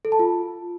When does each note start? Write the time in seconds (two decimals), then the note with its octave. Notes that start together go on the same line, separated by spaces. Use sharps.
0.05 A4
0.12 A5
0.19 F4